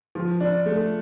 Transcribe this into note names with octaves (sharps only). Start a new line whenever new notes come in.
F3
D4
A3